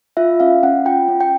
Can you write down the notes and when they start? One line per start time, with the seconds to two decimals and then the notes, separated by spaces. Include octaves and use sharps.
0.17 F4 E5
0.40 C#4 F5
0.63 C#4 F#5
0.85 F4 G5
1.08 C#4
1.21 G5